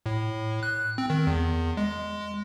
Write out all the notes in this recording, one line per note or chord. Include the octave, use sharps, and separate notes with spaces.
A2
F#6
C4
D#3
E2
G#3